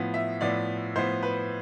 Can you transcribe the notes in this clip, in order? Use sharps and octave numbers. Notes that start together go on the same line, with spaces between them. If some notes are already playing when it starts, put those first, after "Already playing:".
Already playing: A2 F3 B3
E5
A2 F3 B3 D5
A2 F3 B3 C5
B4